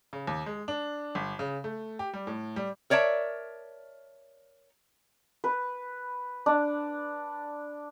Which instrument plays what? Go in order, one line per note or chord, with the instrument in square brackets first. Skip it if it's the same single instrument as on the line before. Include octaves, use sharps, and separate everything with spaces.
[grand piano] C#3
D#2
G#3
D4
G1
C#3
A3
G4
G3
A2
G3
[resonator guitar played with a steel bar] A#4 C#5 D5 E5 A5
[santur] B4
D4